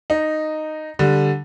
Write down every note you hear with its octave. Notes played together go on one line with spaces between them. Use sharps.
D#4
D3 G3